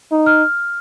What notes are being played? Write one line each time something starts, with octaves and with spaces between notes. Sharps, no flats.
D#4
F6